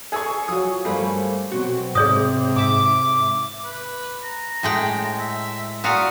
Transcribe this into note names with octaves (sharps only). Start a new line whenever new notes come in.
G#4 A4 G#5 C#6 E6
F3 F#3 D#6
G2 G3 A3 A#3 C5 F5
B2 F#3 C4 F#4
G#2 C3 G#4 C#5 D#6
G#2 E5 D6
B4
A#5
A2 G#3 G5
E5
A#2 F#4 F5 D#6